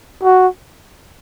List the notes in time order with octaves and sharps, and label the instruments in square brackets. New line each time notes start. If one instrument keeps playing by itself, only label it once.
[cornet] F#4